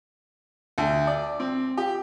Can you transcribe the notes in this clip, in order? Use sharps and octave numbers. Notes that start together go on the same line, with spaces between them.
D2
D5
C4
G4